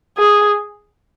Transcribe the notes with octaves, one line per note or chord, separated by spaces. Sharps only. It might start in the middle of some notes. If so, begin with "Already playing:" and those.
G#4